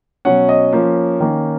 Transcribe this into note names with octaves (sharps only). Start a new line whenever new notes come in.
B2 F#3 C#4 F#5
D#5
F3 A#3 C#4
D#3 A#3 C#4